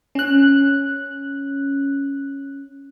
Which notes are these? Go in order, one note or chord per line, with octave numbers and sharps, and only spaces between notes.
C#4 F#6